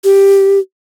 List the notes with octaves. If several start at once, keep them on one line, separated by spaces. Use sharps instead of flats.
G4